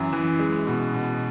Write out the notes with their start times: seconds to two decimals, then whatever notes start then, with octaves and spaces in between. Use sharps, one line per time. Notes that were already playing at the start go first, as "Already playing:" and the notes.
Already playing: F#2 E3
0.13 E3
0.39 G#3
0.67 B2
0.94 B2